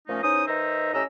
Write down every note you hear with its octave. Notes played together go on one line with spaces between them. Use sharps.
A#2 F3 A3 C#4 D#4
E2 C#4 D#4 C5 D#6
D#3 D#4 B4 C5 E5 A#5
A2 C#4 G4 D#5 A#5 E6